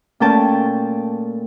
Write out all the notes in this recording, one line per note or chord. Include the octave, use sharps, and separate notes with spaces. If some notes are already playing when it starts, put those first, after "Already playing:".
A#2 A3 C#4 G5 A5